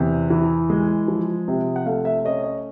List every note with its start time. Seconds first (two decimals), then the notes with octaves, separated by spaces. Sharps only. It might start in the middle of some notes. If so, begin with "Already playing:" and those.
Already playing: E2 C3
0.30 E3
0.70 G#3
1.08 F3
1.48 C3
1.76 F#5
1.86 A3 F5
2.05 E5
2.25 C#4 D#5
2.44 C#5